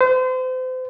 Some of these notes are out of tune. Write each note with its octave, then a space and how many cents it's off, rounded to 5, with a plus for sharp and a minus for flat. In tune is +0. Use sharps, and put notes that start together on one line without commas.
C5 -35